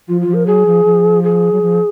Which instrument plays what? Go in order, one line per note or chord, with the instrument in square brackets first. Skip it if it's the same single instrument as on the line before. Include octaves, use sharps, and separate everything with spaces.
[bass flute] F3 [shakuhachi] F4
[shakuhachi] F4
[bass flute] F3
[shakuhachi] A#4
[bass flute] F#3 [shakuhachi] G#4
[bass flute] F3
F3
[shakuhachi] G#4
[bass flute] F#3
F3